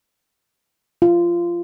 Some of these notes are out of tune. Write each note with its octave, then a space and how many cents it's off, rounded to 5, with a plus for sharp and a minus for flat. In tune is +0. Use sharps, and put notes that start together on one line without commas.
F4 -20